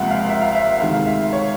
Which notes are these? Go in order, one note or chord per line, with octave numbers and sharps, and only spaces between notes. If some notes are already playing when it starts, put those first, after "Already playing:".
Already playing: C#2 C3 F3 A#3 E5 F#5
F5
E5
F5
E5
D2 C3 D#3 G#3 F5
F5
E5
C#5